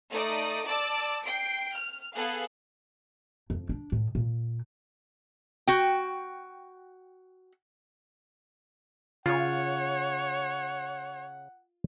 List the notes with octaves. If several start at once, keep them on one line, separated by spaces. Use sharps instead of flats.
A3 D#4 D5 D#6
D5 A5 D6 E6
G5 C7 D7
F6
B3 G#4 A4 F5 F#6
F2
D4
A2
A#2
F#4 G5
C#3 F4 C#5 F#5